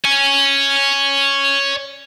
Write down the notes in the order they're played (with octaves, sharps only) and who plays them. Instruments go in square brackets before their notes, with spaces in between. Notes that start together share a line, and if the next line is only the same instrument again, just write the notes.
[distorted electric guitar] C#5 G#5